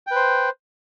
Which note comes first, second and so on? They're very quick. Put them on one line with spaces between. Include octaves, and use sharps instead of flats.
G5 B4 C5